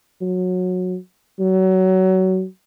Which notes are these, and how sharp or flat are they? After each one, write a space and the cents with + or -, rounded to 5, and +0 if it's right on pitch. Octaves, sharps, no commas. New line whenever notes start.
F#3 -20
F#3 +25